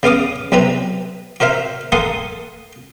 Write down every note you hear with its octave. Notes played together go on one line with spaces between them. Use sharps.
C#3 B3 F5 D6 D#6
B1 C3 C4 B4 A#5
F#4 A#4 C5 E5 F5
A#3 A4 F#5 C6 D#6